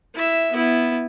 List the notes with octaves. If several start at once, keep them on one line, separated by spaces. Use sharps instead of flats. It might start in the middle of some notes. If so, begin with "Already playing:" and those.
E4 E5
B3 E4